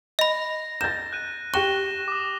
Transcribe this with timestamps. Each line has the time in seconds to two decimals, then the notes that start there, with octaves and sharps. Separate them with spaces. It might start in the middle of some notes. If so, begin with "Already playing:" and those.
0.19 D#5 B5 A#6
0.81 G6 A6 E7
1.13 F#6 D#7
1.54 G4 G5 C#6 F#6 A#6 E7 G7
2.08 D6 D#6